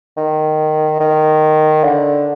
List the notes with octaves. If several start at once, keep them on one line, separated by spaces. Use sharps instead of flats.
D#3
D#3
D3